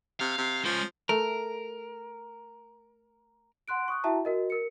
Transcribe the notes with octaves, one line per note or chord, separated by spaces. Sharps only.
C3 F5
C3
F3 G#3 C#4
A3 A#4
F#5 C6 F#6 D7
C#6 D#6 F#6
E4 F#4 E5 G5 A5 A#5
F#4 A#4 D#5
A#4 C#7